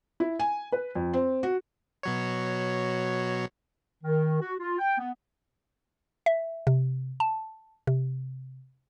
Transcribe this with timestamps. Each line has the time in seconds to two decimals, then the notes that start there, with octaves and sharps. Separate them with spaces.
0.20 E4
0.39 G#5
0.72 B4
0.95 F2
1.13 C4
1.43 F#4
2.03 B2 F#3 C#5
4.04 D#3
4.41 F#4
4.60 F4
4.78 G5
4.98 B3
6.26 E5
6.67 C3
7.20 A5
7.87 C3